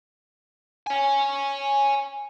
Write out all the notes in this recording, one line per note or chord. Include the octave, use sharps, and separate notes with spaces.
C#5 G#5